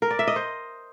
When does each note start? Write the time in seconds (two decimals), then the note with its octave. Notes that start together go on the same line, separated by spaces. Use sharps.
0.02 A#4
0.11 D5
0.19 E5
0.27 D#5
0.36 C5